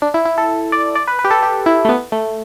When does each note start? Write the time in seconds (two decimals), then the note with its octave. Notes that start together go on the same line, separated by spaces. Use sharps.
0.02 D4
0.14 E4
0.25 E4
0.38 A4
0.72 D5
0.95 D5
1.08 B4
1.19 B4
1.25 G4
1.31 A4
1.43 G4
1.66 E4
1.85 A3
1.89 B3
2.12 A3